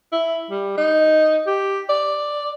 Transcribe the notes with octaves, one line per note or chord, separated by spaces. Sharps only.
E4
G3
D#4
G4
D5